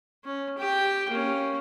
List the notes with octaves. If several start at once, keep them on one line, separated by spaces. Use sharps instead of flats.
C#4
G4 G5
A#3 C#4